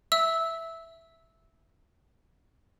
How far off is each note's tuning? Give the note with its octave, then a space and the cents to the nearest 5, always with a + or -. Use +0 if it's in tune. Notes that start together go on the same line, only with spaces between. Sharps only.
E5 +0 E6 -15